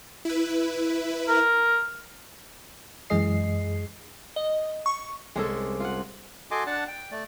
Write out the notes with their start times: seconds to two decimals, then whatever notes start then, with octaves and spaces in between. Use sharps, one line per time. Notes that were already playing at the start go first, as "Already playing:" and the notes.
0.25 E4 B4
1.28 A#4
3.10 F#2 E3 G#3 G#4 D#5 C7
4.36 D#5
4.86 C#6
5.36 C2 G#3 C#4 A4 D6
5.80 F4 F#5
6.51 F#4 A4 D#5 G#5 C6 D6
6.67 D4 D5 F#5 A5
6.88 G5
7.11 A3 D5